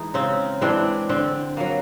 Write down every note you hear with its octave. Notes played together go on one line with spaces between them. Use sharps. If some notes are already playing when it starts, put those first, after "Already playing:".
Already playing: E3 G#3 D#4
C#3 C4
E3 G#3 C4 D4
D3 C4
F#3 A#3